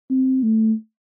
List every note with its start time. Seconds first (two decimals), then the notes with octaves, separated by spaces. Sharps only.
0.10 C4
0.43 A3